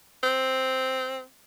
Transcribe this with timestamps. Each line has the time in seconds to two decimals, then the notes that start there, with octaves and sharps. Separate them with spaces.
0.23 C4